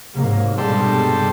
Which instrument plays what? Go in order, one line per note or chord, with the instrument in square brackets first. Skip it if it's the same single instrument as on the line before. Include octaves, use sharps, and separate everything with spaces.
[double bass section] G#2 F#3 A#3 [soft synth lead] C3
[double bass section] G2 B2 G#3 [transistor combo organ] G3 A4 C5